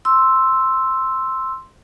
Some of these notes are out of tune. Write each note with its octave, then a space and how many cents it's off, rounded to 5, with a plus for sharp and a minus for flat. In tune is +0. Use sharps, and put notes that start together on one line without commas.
C6 +0 E6 +0